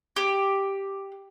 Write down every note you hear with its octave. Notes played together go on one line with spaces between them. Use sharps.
G4